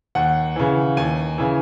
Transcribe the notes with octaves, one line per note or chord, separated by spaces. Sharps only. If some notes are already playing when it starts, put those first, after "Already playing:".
D#2 F#5
C#3 E3
D#2 G#5
C#3 E3